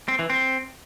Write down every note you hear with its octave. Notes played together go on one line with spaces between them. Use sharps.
C4
E3
C4